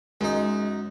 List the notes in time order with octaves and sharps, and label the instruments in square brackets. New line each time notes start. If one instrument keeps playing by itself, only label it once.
[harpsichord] F#2 D#4 [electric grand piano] G#3